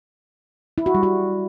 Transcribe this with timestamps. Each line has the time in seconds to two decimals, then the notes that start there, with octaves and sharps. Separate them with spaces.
0.78 E4
0.86 F#4
0.95 G3
1.03 F#4